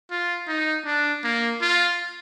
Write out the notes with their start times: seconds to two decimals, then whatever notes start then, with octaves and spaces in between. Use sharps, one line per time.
0.11 F4
0.48 D#4
0.86 D4
1.24 A#3
1.62 F4